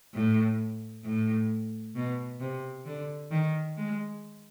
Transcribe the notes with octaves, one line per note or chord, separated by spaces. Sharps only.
A2
A2
B2
C3
D3
D#3
G#3